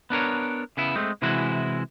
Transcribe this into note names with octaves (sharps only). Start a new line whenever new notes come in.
B3 D4 A#4 C#5
C#3 B3 E4
G#3 A3 C4
C3 E3 G#3 E4 F#4